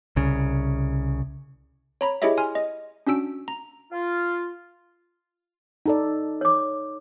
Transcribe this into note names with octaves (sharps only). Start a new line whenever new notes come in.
C2 C#3
C#5 A#5 B5
E4 G4 G#4 C#5 D#5 E5
G#5 C6 F6
D#5
C#4 D4 F#4 E6 D7
A#5
F4
D#4 A4 D5
C#5 D6